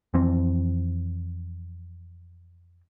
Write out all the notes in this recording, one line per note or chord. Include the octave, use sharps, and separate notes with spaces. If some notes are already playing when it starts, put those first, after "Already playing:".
F2 E3 C4